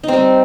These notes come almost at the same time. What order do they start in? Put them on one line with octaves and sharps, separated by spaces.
D#4 C4 G3